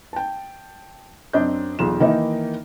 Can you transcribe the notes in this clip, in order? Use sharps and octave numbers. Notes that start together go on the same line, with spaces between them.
G5 A5
F#2 C4 D4 D#5 G6
B1 E2 F4 E7
D#3 E3 A#3 D#4 E4